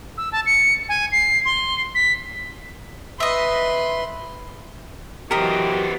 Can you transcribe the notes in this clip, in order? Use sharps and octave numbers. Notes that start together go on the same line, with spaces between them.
E6
A5
C#7
G#5
C7
C6
B6
B4 D#5 E5 C6
E3 F#3 B3 G4 A#4 C5 D#5